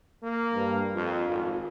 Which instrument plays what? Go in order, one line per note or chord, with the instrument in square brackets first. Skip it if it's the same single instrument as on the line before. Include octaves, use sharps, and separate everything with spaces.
[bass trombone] A#3
[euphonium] G2
[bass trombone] F2 [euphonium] F4
[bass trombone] G#1